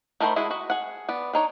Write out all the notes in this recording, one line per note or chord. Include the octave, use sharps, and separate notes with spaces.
D#3 A3 A#4 C5 B5
G#3 E4 F#4 G#4
F#4 D#5
G#4 F#5
B3 D5
D4 D#4 C#5